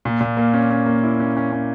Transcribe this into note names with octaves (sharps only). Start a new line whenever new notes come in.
A#2
A#2
A#3
C#4
C#4
A#3
E4
C#4
C#4
C#4